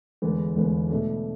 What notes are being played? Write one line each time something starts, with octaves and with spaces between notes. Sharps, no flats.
E1 E2 D3 G#3 B3
E1 E2 D3 G#3 B3
B2 A3 D4